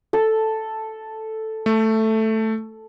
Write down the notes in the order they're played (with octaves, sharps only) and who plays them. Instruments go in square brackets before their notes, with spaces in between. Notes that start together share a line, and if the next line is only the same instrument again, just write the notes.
[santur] A4
[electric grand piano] A3